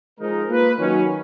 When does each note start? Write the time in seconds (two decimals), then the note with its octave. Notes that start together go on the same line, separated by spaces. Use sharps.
0.19 F3 G#3 D#4 A#4
0.49 A#3 F4 B4
0.79 D#3 F#3 C#4